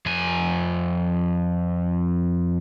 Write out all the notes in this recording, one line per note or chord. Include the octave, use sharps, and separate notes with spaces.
F2 G#5